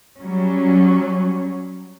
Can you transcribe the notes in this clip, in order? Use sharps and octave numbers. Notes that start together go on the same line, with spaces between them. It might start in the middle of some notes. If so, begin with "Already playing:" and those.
F#3 G3 C#4